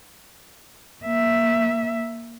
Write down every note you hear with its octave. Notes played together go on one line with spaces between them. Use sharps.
A#3 E5